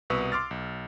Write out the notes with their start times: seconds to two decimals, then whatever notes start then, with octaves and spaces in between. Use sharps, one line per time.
0.10 C2 B2 B4 C#6 D#6 E6
0.32 C6 D6 F6 A6
0.51 B1